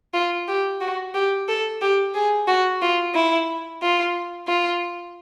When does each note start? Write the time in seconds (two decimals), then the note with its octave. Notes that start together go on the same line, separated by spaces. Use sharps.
0.14 F4
0.48 G4
0.81 F#4
1.14 G4
1.48 A4
1.82 G4
2.14 G#4
2.47 F#4
2.82 F4
3.14 E4
3.82 F4
4.48 F4